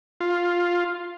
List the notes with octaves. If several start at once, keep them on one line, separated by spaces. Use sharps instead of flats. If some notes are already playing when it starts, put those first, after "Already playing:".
F4